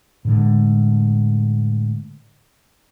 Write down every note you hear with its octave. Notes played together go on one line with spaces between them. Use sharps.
A2 D3 G#3